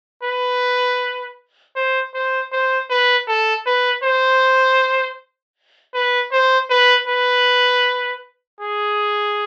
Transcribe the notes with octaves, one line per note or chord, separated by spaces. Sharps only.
B4
C5
C5
C5
B4
A4
B4
C5
B4
C5
B4
B4
G#4